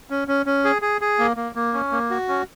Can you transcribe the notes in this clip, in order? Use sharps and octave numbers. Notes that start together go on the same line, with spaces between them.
C#4
C#4
C#4
G#4
G#4
G#4
A#3
A#3
A#3
C#4
A#3
F#4
C#4